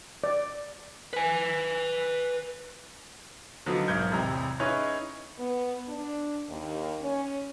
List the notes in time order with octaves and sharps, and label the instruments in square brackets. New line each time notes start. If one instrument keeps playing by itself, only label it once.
[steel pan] D5
[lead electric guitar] B4 G#5
[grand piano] D3 F3 F#3 B3 D#4
B1 G#2 A#4 G6 G#6
E1 A1 C3 G3 A#5
C#4 D#4 E4 G#4 B4 C#5
[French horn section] B3
D4
D#2
C#4